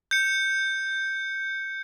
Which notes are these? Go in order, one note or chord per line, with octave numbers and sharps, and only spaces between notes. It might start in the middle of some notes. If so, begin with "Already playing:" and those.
G6 C#7